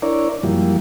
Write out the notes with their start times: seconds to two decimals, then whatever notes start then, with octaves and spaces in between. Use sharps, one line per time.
0.02 D4 E4 A#4 C#5 D5
0.43 F#2 E3 F3 G3 A#3